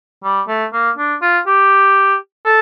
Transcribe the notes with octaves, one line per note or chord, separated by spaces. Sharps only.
G3
A3
A#3
D4
F4
G4
A4